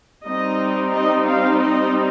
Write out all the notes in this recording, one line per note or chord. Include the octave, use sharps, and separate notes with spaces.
G3 C4 D#4 D#5
D#5
F5
D#5